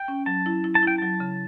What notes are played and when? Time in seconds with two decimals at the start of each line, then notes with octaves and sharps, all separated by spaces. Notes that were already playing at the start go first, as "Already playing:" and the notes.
Already playing: G5
0.08 C#4
0.26 F#3 A5
0.46 E4
0.64 E4
0.75 A5
0.83 E4 G5
0.98 F#3 A5
1.20 C#3